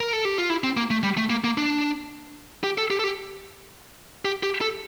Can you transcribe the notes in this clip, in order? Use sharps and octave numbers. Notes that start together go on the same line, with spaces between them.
A#4
A4
G4
F4
E4
C4
A#3
A3
G3
A3
A#3
A#3
D4
G4
A4
G4
A4
G4
G4
G4
A4